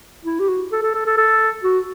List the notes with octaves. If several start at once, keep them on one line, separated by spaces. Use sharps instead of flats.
E4
G4
F#4
A4
A4
A4
A4
A4
F#4